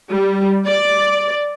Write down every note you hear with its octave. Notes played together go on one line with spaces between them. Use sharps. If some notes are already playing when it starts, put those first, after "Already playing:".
G3
D5